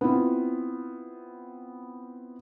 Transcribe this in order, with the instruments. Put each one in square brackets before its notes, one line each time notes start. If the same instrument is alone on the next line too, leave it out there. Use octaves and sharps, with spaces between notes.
[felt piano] B3 C4 E4 F4